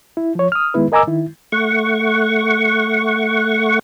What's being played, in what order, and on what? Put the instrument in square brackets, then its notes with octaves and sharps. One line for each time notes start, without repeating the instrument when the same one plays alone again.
[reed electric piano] E4
F3 C#5
D#6 F6
D#3 G#3 B3 E4 B4
A#4 D#5 G#5 A#5 D6 E6
D#3 E4
[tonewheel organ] A3 F#5 C#6